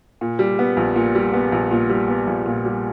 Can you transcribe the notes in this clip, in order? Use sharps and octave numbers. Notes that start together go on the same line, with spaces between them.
A#2
G3
B3
A#1
A#2
G3
B3
A#1
A#2
G3
B3
A#1
A#2
G3